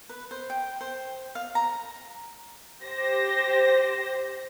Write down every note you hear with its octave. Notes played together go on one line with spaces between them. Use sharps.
B4
C5
G5
C5
F5
A#5
G4 C5 A#6